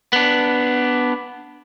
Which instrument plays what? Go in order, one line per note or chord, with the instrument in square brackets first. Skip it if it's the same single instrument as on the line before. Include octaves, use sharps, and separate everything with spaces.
[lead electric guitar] B3 D4